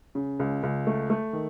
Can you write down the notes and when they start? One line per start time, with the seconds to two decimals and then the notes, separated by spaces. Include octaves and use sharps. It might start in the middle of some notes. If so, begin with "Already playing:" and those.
0.15 C#3
0.40 C#2
0.63 C#2
0.87 A3
1.10 A3
1.33 D#3